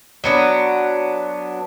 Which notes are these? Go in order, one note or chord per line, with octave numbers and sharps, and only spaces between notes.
F#3 B3 D4